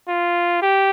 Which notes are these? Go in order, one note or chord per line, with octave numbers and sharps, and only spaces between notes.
F4
G4